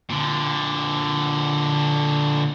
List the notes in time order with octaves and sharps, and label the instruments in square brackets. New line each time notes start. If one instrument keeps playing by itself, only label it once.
[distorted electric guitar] A#2 D3